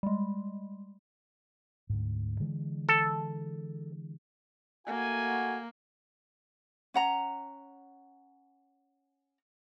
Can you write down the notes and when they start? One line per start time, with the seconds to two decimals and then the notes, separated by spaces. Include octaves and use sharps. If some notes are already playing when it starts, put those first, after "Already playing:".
0.03 G3 G#3
1.90 D2 G#2
2.40 D3 E3 G#3
2.89 A4
4.87 A3 A#3 F#4 G#5
6.94 C#4 F#5 A#5